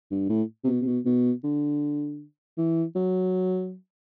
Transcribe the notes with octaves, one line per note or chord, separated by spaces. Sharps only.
G2
A2
C3
B2
C3
B2
B2
D3
E3
F#3